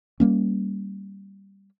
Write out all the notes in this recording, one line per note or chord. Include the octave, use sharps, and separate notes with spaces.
G3 A#3 C#4